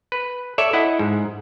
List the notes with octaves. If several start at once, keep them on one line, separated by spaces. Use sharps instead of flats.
B4
A4 C#5 D5 E5
E4 D#5 F#5
G#2